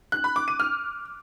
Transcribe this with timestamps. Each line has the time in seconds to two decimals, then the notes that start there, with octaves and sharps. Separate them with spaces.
0.12 F#6
0.24 B5
0.36 D6
0.48 D#7
0.60 F6